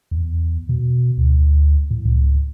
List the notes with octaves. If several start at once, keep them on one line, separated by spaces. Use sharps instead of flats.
E2
B2
D2
A2
C#2